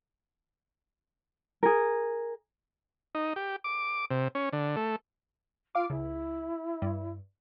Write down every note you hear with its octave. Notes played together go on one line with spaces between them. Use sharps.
G#4 A#4
D#4
G4
D6
C3
C#4
D3
A3
F4 F5 D6
C#2 E4
G2